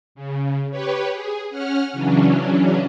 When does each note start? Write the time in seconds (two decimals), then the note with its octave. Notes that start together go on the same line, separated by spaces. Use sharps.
0.15 C#3
0.71 G4 B4 C#5
1.12 G#4
1.50 C#4 F#5 F6
1.93 C#3 E3 F#3 C#4 D4